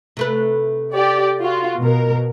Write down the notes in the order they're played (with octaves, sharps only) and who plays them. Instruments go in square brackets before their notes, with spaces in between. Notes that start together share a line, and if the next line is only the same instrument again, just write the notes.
[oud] C3 A3 B4
[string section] G4 D5
F4 F#4
B2 A#4